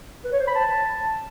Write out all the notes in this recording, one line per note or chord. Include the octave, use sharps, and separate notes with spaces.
B4
C#5
C5
B5
A5